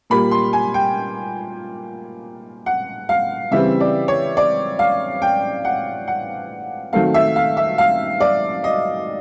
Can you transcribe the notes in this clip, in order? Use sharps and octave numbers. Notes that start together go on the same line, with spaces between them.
A#2 G3 A#3 B5
C6
G#5
G5
F#5
F5
C#3 E3 G3 C4 E5
D5
C#5
D5
F5
G5
F#5
F#5
D#3 F#3 A3 C4 F5
E5
F5
E5
F5
D5
D#5